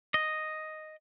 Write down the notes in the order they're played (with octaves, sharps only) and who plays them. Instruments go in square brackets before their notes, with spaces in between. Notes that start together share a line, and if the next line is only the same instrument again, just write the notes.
[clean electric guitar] D#5